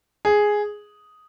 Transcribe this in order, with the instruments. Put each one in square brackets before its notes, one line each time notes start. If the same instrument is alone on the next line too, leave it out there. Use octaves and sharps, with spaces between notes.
[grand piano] G#4